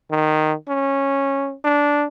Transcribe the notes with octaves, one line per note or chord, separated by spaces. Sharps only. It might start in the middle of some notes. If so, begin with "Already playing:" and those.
D#3
C#4
D4